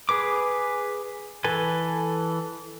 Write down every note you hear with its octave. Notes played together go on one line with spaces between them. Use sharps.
G#4 B4 D6
E3 A4 B4 G#5